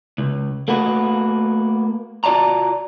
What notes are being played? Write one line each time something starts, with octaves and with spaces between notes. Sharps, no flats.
C#2
A3 A#3 F#4 B4
F4 F#4 D5 A5 A#5